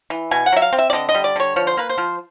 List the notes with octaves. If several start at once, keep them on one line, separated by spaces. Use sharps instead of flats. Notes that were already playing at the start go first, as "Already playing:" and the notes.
E3
B2 G#5
F#5
F#3 E5
F5
C4
E5
D5
D3 D#5
D#5
G3
D5
D3 C#5
F3 C#5
C5
A#3 B4
C5
F3